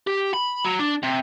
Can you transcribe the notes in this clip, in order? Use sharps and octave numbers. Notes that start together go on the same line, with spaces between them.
G4
B5
F#3
D4
C3